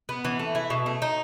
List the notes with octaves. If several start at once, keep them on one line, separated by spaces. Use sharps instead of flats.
B3
E3
A3
E4
B2
A3
D#4